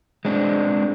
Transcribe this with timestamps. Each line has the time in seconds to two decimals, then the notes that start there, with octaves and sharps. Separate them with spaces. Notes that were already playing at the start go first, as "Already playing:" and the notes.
0.25 G#3 C4 D4